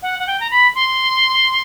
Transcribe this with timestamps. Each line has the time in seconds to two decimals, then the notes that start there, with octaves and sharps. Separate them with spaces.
0.02 F#5
0.19 F#5
0.27 G5
0.40 A#5
0.51 B5
0.75 C6